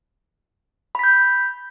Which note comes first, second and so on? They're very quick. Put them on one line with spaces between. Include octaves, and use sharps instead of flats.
B5 B6 G6